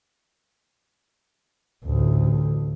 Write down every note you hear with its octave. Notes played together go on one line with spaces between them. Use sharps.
A1 D2